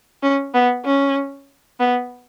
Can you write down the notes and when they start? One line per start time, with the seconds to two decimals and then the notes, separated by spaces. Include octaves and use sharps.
0.23 C#4
0.54 B3
0.85 C#4
1.80 B3